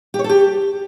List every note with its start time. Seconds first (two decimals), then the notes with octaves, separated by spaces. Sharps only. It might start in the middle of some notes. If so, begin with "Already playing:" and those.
0.14 G4
0.19 C#5
0.24 A4
0.29 G4